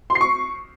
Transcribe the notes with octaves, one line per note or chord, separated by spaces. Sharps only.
C6
C7
C#6